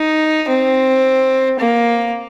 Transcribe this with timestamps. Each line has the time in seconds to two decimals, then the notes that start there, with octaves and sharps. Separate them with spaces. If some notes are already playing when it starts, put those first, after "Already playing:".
Already playing: D#4
0.49 C4
1.59 A#3